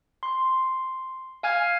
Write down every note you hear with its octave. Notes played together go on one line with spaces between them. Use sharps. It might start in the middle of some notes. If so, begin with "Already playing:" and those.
C6
F5 G#5 F6 G#6